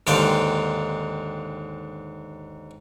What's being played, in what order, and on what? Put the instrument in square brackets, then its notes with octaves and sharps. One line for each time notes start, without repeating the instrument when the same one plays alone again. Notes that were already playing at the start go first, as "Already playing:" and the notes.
[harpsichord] D#2 G#2 D3 C5 F5 G5